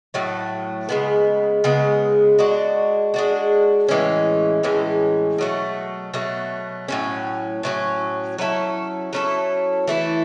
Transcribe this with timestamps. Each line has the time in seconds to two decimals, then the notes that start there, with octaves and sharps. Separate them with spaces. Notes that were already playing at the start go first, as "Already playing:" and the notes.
0.14 A2 F#3 A3
0.89 C#3 G#3 B3
1.64 C#3 G#3 B3
2.39 G#3 D4 F#4
3.14 G#3 D4 F#4
3.88 A2 E3 G#3 C#4
4.63 A2 E3 G#3 C#4
5.38 B2 F#3 A3
6.14 B2 F#3 A3
6.88 A2 F#3 C#4
7.63 A2 F#3 C#4
8.38 F#3 C#4 E4 A4
9.13 F#3 C#4 E4 A4
9.88 E3 A3 E4